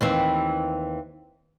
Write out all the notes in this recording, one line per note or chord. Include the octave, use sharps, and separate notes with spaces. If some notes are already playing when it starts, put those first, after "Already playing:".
D#2 E3 C4